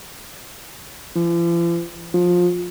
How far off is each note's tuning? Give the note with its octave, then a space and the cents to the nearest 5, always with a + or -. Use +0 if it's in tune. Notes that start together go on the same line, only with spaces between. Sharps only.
F3 -45
F3 +20